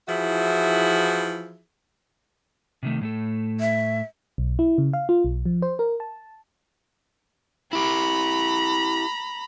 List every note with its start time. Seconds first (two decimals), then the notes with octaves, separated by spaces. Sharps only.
0.08 E3 F3 E4 F#4 G#4 E5
2.83 C3 D#3 A3
3.01 A2 A3 A4
3.60 E5
4.38 B1
4.59 E4
4.78 C#3
4.93 F5
5.09 F4
5.24 B1
5.46 F3
5.62 C5
5.79 A#4
6.00 A5
7.73 E4 G4 A#5 B5